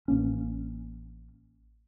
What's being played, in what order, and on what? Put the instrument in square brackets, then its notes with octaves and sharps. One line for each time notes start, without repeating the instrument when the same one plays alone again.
[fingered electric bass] A1 A#3 C#4